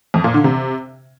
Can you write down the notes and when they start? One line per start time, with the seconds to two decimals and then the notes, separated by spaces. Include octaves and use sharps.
0.14 F2
0.24 A#2
0.34 D3
0.44 C3